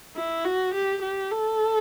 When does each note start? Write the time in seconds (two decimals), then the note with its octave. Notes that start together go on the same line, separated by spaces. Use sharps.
0.16 E4
0.45 F#4
0.74 G4
1.02 G4
1.31 A4